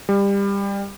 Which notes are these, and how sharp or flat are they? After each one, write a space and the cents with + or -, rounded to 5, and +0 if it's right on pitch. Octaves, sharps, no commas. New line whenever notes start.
G3 +25